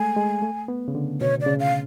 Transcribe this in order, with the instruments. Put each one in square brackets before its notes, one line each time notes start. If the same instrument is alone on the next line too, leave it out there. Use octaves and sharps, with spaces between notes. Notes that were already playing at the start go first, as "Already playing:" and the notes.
Already playing: [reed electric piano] G#3 A3 [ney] G#5
[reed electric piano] G#3
A3
B3
C#3
D3
[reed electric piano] B2 [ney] C#5
[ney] D5
[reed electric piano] C#3
[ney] F5